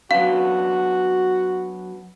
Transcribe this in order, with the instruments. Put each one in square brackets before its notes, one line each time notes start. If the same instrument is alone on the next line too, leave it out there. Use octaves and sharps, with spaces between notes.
[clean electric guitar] F#3 B3 D4 [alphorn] F#4 [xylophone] F5